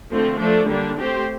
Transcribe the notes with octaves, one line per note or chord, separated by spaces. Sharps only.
D3 F3 A3 C4
F3 A3 D4 A4
D3 G3 A#3 D4
A3 C4 G4 C5